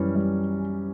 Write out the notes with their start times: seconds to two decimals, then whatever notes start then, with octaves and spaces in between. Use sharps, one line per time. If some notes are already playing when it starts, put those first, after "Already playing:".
Already playing: F#2 E3 G3 C#4
0.15 G3